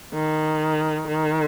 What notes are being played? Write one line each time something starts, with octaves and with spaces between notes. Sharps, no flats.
D#3
D#3